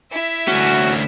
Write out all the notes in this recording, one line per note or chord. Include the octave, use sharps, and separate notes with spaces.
E4 E5
D2 C#4 F#4